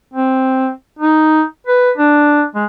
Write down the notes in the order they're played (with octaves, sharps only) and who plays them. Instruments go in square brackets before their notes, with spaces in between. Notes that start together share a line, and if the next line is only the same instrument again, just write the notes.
[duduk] C4
D#4
B4
D4
G#3